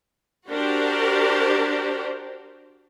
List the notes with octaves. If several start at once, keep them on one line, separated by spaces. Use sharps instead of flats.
D4 F#4 G4 A#4 C5 D5